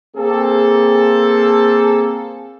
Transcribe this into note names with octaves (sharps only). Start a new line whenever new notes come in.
A#3 C4 G#4 A4